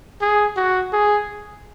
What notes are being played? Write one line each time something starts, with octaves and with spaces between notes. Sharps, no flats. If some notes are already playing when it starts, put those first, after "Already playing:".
G#4
F#4
G#4